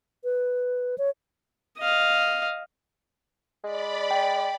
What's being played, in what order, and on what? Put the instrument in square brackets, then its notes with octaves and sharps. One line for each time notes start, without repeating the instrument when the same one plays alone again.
[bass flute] B4
C#5
[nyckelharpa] D#5 F5
[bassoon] G#3 [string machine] D5 B5
[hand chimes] G5